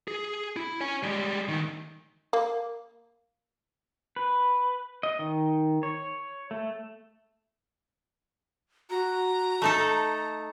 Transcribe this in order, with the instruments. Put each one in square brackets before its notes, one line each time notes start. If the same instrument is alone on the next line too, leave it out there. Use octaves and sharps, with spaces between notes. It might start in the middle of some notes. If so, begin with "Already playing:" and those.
[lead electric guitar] G#4
E4
C#5 G#5
G3 G#3
D2 D#3
[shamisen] A#3
[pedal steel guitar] B4
D#5
D#3
C#5
A3
[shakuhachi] F#4 [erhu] A#5
[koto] A3 D#4 A4 [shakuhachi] A5